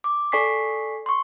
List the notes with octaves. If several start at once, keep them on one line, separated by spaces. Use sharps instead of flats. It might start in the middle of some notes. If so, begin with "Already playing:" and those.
D6
A4 D5 G#5 C#6 B6 C7
C6 C#6